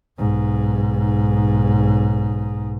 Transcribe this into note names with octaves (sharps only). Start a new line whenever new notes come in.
B1 G#2